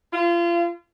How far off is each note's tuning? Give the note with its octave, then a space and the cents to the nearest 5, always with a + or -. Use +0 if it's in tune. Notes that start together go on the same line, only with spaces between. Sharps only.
F4 -30